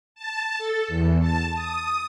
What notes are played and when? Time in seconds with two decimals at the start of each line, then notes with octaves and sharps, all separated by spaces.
0.15 A5
0.58 A4
0.88 E2
1.20 A5
1.53 D#6